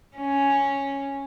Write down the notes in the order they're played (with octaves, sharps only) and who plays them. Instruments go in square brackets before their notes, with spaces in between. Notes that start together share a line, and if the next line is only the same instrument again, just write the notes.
[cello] C#4